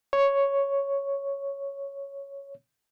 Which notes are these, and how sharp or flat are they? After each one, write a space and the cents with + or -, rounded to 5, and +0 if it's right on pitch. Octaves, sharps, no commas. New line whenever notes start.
C#5 +0